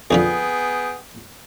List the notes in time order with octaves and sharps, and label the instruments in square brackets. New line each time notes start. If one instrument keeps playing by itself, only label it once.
[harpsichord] F2 D3 F3 [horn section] B3 G#4 G5